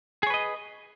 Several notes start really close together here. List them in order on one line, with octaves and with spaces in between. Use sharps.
G#4 C#5 B4 D#5